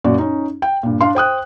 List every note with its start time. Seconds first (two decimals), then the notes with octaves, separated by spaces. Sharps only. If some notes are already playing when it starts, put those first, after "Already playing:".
0.04 F#2 A#2 F#4 D5
0.18 C#4 D#4
0.62 G5
0.83 G2 A#2
1.01 D4 F5 C6
1.15 C5 G5 D#6 F#6